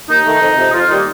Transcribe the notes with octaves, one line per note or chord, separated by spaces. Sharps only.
D#2 D#4
D#3 A3
F2
C3 F3
F2 F4
D#3 G3 A#3 D#4